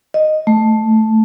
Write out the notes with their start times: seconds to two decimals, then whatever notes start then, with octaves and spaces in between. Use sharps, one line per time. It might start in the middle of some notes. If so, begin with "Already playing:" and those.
0.14 D#5
0.47 A3